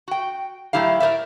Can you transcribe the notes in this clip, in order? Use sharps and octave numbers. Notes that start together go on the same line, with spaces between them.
F#4 G5
A2 F#3 A3 E4 G4 F5
A#4 C5 D5 E5